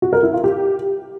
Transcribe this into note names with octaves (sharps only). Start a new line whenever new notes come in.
F#4
A#4
E4
F4
G4